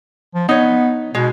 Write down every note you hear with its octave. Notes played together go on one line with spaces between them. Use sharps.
F3
B3 D#4 C#5
B2 G#3